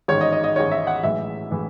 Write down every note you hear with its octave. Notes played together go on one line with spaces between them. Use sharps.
A1 G#2 D#3 C#5
D#5
D#5
D#5
A1 G#2 D#3 C#5
E5
F#5
B1 A2 E3 G#3 E5
A2 E3 G#3